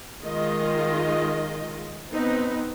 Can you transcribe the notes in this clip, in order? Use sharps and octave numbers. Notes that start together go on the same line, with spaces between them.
D#3 G#3 F4 D#5
B3 C4 D#4 B4